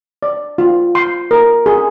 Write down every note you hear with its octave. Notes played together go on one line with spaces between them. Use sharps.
D5
F4
C6
A#4
G#4